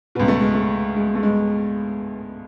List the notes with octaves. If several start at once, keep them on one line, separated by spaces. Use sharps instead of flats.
C#2 B2 B3
A3
G#3
A3
G#3
A3
G#3